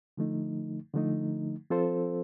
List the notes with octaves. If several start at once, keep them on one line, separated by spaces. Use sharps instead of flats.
D3 F3 A3 D#4
D3 F3 A3 D#4
F3 C4 F4 A4 C5